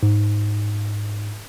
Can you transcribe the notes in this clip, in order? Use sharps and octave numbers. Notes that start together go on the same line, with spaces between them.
G#2